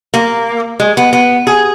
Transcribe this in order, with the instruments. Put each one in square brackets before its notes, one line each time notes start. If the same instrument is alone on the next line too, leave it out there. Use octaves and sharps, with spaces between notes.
[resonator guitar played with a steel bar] A#3
G#3
B3
B3
G#4